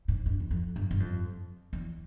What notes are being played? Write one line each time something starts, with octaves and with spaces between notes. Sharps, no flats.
G#2
G2
E2
F2
G2
G2
F2
E2